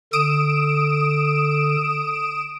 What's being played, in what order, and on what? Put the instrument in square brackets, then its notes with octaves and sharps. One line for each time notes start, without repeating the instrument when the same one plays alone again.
[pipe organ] D3 A4 [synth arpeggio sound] D#6 D7 E7